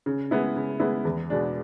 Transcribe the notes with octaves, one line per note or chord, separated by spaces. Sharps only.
C#3
G#3 B3 E4
C#3
G#3 B3 E4
E2
B2 G#3 D4